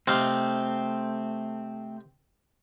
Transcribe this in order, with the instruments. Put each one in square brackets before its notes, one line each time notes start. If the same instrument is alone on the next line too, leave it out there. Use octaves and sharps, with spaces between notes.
[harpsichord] C3 D#4 F5 [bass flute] A3 [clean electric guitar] C4